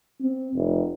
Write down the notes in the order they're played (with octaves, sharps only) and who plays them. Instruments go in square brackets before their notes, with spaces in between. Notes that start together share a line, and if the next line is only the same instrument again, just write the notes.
[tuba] C4
F1